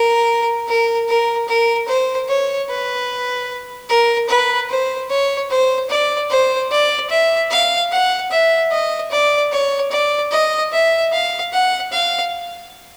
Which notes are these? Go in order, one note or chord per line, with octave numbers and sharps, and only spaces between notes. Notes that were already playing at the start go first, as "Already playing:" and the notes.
Already playing: A#4
A#4
A#4
A#4
C5
C#5
B4
A#4
B4
C5
C#5
C5
D5
C5
D5
E5
F5
F#5
E5
D#5
D5
C#5
D5
D#5
E5
F5
F#5
F5